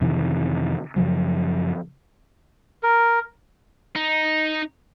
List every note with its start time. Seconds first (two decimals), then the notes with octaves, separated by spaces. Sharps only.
0.01 F2 C3 D#3 E3
0.96 F#2 C#3 F3 F#3
2.83 A#4
3.96 D#4